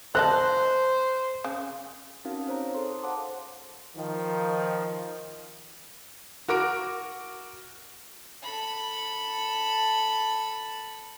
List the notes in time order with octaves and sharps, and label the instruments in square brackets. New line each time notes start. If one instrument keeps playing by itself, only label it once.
[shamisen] A4 D#5 A5 [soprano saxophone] C5 [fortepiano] F#6
[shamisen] C#3
[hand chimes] C4 C#4 D#4 F#4 A#4 F5
D#4 C5 C#5 A#5
G#4 A4 C6
C5 F5 F#5 A5 C6 D6
[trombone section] D#3 F3
[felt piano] F#4 A#4 D6 D7
[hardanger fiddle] A4 B5